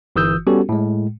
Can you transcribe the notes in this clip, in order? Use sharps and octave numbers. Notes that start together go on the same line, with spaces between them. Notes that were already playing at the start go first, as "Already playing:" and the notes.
G1 E3 D#6 E6 G6
G3 B3 C#4 F#4 G4 A4
A2 G#3